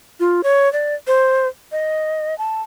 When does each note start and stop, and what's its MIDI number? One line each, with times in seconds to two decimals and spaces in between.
0.20 0.41 65
0.44 0.71 73
0.73 0.95 74
1.07 1.48 72
1.72 2.37 75
2.38 2.61 81